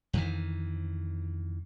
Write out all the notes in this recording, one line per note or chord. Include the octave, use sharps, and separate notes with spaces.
F2 D#3 E3